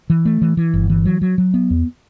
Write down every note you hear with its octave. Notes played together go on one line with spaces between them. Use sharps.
E3
A3
E3
E3
G1
E3
F#3
F#3
F#3
B3
E2